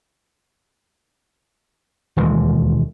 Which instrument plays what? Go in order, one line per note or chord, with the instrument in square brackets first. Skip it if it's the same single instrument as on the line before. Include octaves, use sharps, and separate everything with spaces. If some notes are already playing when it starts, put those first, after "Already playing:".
[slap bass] E1 D#2 E3 G#3